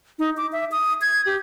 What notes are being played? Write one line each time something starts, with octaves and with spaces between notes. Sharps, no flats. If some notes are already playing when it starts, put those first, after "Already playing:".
D#4
D6
E5
D#6
G#6
G4